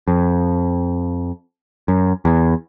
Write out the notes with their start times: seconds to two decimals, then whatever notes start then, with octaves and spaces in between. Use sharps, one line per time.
0.08 F2
1.88 F#2
2.25 E2